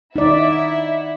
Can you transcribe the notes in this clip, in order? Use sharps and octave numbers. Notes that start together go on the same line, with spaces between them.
D#4 E4 D5 E5 F#5